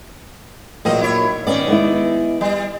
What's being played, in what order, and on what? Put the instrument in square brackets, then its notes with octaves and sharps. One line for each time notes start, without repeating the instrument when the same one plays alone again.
[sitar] E2 C4 D#5 [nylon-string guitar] A#2 F#3
[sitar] E4 C#5
[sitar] D#3 D5 [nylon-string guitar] B3 C#4
[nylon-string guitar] G#3 B3 E4
[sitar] G3